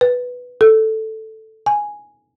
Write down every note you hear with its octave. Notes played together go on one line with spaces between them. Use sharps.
B4
A4
G#5